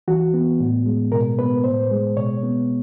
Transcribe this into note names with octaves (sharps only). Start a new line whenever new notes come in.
E3 F#4
B3
A2
G#3
B2 A#4
B3 B4
A2 C5
G#3
B2 C#5
B3